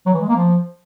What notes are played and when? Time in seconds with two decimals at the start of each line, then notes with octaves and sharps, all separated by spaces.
0.06 F#3
0.14 E3
0.21 G#3
0.29 A#3
0.36 F3